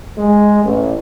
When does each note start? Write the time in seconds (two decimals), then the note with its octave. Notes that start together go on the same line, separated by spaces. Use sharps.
0.18 G#3
0.63 A1